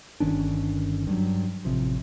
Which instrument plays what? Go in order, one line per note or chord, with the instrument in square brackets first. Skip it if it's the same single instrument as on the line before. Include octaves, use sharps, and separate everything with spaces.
[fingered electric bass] G1 D#3 C#4 D4
G2 F#3
A1 C3 F3